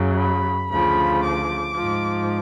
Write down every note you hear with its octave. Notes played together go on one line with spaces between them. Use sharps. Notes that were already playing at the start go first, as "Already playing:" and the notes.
Already playing: F#2 C#3 F#3
B5
D2 C#3 F3 B5
D6
G#2 F3